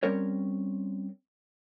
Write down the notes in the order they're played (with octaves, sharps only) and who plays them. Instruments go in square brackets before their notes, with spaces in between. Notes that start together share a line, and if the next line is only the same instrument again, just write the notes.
[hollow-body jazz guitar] G3 C4 C#4 A#4 C#5